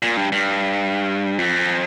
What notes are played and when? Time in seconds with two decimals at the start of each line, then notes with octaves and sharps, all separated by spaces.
0.02 A#2
0.17 G2
0.32 G2
1.38 F2